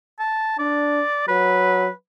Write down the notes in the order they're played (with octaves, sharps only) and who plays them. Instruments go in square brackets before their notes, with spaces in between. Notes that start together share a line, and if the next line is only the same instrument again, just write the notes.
[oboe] A5
[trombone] D4 [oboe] D5
[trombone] F#3 [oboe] B4